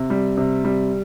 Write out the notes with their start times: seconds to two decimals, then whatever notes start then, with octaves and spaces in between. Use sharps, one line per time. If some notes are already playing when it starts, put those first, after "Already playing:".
Already playing: C3
0.10 G3
0.37 C3
0.64 G3